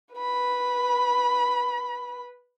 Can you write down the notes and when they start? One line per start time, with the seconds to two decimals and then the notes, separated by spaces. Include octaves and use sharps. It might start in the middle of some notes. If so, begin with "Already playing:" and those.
0.15 B4 B5